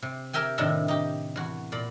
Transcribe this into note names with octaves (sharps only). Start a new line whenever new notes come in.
C3
G4 A#4 E5 G5 G#5
A2 C3 D#3 D4 E5
D#4 G4
E2 F#4
A#2 D5 B5